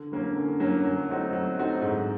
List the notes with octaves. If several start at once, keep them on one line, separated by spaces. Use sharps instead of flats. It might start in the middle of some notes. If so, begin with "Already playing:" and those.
Already playing: D3
F#3 A#3 C#4
D3
F#3 A#3 C#4
F#3
A3 C4 D#4 F#4
F#3
A3 C4 D#4 F#4
G#2